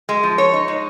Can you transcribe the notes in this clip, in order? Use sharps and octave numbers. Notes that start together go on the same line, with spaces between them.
G#3
F3
C#5
D#4
G#3